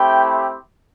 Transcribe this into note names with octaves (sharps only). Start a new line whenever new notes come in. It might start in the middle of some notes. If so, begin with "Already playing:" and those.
Already playing: A3 C4 E4 G4 G5